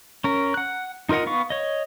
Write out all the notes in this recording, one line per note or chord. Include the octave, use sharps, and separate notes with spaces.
C#4 A#4
F#5 F#6
D#4 F4 A#4 D#5 F#5
B3 F5 C#6
C#5 D#5